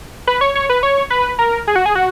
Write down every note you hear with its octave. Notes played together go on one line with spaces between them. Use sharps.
B4
C#5
C#5
B4
C#5
B4
A#4
G#4
F#4
G#4
F#4